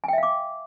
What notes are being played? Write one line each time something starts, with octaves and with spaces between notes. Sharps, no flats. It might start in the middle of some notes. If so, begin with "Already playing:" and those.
E5 F5 G5 G#5 D6